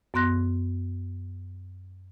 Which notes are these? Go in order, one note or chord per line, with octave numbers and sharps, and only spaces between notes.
F#2 B3 C6 F#6 A#6